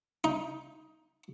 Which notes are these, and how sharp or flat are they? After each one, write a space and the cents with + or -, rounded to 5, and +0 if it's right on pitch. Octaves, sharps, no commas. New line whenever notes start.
D#4 +15